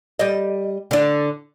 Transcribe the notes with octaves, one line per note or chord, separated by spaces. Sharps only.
G3 D#5
D3 D4